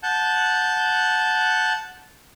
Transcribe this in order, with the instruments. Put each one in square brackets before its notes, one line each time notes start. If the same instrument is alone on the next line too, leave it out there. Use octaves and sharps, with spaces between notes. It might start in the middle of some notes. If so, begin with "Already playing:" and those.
[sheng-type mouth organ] F#5 A5 G6